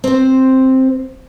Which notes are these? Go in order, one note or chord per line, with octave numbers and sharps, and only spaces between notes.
C4 C5